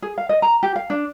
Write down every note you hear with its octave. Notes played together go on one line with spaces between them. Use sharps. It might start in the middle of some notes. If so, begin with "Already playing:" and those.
G#4
F5
D#5
A#5
G4
F5
D4